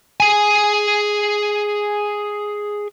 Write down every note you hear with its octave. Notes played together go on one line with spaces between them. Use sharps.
G#4 G#5